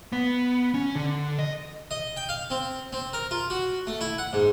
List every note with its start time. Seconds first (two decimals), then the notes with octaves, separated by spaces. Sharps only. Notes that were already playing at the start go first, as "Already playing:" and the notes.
0.12 B3
0.74 C#4
0.95 D3
1.39 D#5
1.91 D#5
2.17 G5
2.29 F5
2.50 C4
2.93 C4
3.13 A#4
3.31 F4
3.50 F#4
3.87 A3
4.01 E4
4.18 F#5
4.33 G#2